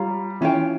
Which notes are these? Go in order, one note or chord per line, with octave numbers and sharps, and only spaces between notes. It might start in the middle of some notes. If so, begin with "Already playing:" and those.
Already playing: G3 F4 C#5 F5 A#5
E3 C#4 F4 C#5 G5